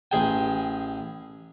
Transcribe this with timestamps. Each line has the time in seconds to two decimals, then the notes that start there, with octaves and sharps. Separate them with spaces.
0.12 A1 G#4 G5